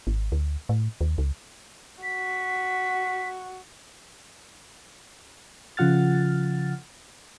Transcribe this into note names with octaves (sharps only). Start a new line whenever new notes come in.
G#1
D2
A2
D#2
C#2
F#4 B6
C#3 F3 F4 F#5 F6 A6